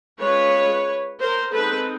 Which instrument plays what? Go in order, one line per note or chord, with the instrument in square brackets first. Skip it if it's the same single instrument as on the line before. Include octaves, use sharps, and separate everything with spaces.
[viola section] G#3 C#4 F4 B4 C#5
A#4 C5
G#3 C4 D#4 A4 B4